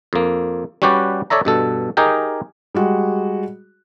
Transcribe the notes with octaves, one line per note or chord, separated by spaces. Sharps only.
F2 A#3
G3 C#4 F#4 G4 B4 D5
A4 C#5 D5 E5 A#5
G2 B2 A4
D#4 G4 G#4 A#4 G5
G3 G#3 F#4